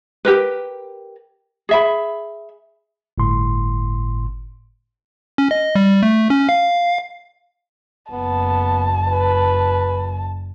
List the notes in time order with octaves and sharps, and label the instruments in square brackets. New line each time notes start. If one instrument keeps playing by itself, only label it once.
[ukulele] G4 A#4 B4
G#4 E5 B5
[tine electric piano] G1 A2 C6
[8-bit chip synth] C#4
D#5
G3
A3
C#4
F5
[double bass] F#1 [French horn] B3 [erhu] A5
[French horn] B4